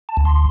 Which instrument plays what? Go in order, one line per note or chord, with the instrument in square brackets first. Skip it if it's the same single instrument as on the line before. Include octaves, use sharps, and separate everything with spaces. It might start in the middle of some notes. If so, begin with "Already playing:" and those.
[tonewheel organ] A5
D2
C6